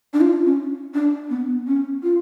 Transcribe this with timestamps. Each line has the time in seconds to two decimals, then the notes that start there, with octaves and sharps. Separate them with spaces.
0.14 D4
0.21 F4
0.45 C#4
0.94 D4
1.30 B3
1.67 C#4
2.03 F4